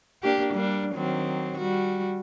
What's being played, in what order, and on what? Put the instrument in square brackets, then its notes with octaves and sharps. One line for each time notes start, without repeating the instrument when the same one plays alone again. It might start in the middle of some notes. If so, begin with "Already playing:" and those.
[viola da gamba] A#3 D4 G4
G3 A#3 D4
D#3 F#3 C4
G3 F#4